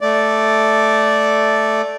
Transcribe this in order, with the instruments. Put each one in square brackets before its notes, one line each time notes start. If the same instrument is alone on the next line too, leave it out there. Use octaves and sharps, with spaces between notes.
[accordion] A3 D5